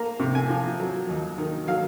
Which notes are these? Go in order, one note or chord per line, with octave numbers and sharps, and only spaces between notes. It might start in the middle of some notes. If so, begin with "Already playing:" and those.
Already playing: A#3 A#5
C3
G#5
F3
F#3
D#2
D#3
F#3 F5